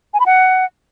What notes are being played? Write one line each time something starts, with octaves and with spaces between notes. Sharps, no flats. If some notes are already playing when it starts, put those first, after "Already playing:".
G#5
B5
F#5